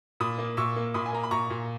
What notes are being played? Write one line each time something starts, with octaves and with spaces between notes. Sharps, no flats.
A#2 B5 D#6
A#3
A#2 C#6 E6
A#3
A#2 B5 D#6
G#5
A#3 A#5
B5
A#2 A#5 C#6
A#2